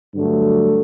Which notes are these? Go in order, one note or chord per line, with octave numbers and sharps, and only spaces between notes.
G2 D3 F#3 A3